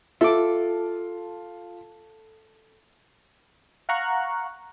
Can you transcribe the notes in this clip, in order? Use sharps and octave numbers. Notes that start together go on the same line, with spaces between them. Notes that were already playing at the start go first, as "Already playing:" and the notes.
F4 A4 E5 D6
F5 F#5 A#5 C#6 F#6